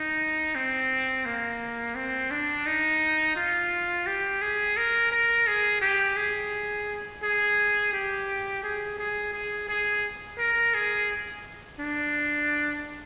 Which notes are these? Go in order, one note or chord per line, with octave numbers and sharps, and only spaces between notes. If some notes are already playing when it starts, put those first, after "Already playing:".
Already playing: D#4
C4
A#3
C4
D4
D#4
F4
G4
G#4
A#4
A#4
G#4
G4
G#4
G#4
G4
G#4
G#4
G#4
G#4
A#4
G#4
D4